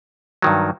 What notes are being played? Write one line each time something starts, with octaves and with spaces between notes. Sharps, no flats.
G2 D#3 F#3